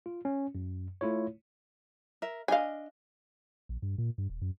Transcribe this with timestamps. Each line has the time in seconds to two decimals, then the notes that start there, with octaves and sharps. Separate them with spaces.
0.06 F4
0.25 C#4
0.55 F#2
1.01 A3 E4 F4 C#5
2.22 A#4 E5
2.48 D4 D#5 F5 G#5
3.69 A#1
3.82 G2
3.98 A#2
4.18 G2
4.30 D#1
4.42 F#2